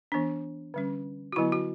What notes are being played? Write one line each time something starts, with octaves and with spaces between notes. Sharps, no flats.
E3 B3 D4
D3 G3 C#4
F#4
D3 F#3 B3 E4
F#4